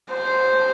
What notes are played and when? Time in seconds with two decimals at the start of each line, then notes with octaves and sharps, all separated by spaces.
0.12 C5